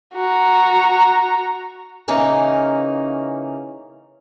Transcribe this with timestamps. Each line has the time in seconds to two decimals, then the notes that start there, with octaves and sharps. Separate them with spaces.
0.15 F#4 A#5
2.08 C#3 E3 A#3 C#4 D#4 A#4